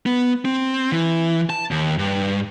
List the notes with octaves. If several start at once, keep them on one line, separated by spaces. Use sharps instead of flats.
B3
C4
E3
A5
D#2
G2